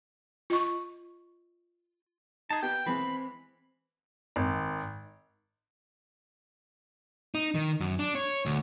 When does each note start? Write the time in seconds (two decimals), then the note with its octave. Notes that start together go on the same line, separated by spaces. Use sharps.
0.50 F4 D#5 C#6
2.50 D#4 G#4 A5
2.62 B3 G4 G5 G6
2.86 E3 G#3 B3 C4 B5
4.36 G#1
7.35 D#4
7.55 D#3
7.80 F#2
7.99 D4
8.15 C#5
8.46 D2